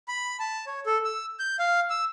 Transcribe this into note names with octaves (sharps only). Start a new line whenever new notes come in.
B5
A5
C#5
A4
E6
G6
F5
E6